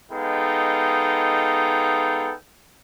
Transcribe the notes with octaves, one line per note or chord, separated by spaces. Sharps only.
G#3 B3 D#4 A4 F5 G5